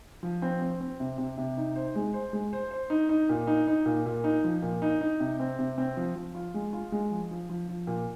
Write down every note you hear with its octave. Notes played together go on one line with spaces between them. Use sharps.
F3
C4
C4
C4
C3
C3
C3
D#4
C5
G#3
C5
G#3
C5
C5
D#4
D#4
A#2
D#4
D#4
A#2
A#2
D#4
F3
A#2
D#4
D#4
C3
C4
C3
C4
F3
F3
F4
G#3
F4
G#3
F3
F3
F3
F3
A#2